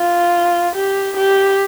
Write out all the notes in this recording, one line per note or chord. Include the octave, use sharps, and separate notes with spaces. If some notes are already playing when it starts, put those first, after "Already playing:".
Already playing: F4
G4
G4